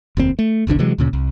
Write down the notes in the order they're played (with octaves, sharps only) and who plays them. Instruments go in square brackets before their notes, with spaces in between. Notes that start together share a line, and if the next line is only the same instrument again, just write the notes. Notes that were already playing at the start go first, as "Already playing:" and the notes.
[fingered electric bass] F1 D#2 C4
A3
F1 B1 D3 D4
C3 E3 F#3 G#3
D2 A#2 C#3
C2